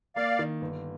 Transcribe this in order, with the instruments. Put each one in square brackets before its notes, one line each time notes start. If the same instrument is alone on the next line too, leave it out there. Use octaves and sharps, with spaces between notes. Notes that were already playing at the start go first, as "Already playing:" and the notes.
[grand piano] A#3 [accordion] D5 F5
[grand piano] D#3
G1